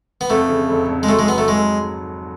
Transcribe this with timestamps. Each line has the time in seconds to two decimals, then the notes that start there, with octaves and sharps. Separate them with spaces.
0.21 B3
0.30 F2 A3
0.49 C#3
0.70 F1
0.89 F1
1.03 G#3
1.09 F#3 A3
1.19 G#3
1.28 F#3 B3
1.38 A3
1.48 G#2 G#3